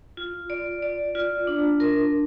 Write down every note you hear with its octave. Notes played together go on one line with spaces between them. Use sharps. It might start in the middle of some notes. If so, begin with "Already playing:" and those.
F4
D5
D5
F4
D4
A#4